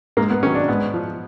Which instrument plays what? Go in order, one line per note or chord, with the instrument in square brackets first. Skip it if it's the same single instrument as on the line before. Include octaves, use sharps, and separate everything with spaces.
[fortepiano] G#2 A#3
B3
D#3 F#3 C#4
D4
G#2 B3
F3